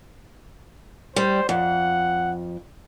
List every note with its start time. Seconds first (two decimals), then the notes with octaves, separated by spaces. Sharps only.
1.16 G3 C5
1.49 F2 F#5